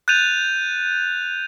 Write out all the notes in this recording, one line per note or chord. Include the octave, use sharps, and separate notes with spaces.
F#6 G6 A6 D#7 F7